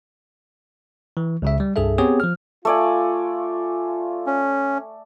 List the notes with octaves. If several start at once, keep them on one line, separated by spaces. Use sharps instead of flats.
E3
C#2 C#3 E5
G3
C2 G2 G#4 A4 E5
B3 C4 G4 G#4 C#5
F3 F6
A3 F4 D5 G#5
C#4